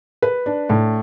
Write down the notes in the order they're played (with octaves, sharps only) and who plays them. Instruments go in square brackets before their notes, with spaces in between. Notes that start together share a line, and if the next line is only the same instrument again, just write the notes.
[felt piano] B4
D4
A2